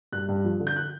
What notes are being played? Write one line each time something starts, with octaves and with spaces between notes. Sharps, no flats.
G2 F#6
G2
F3
D3
G6
F#6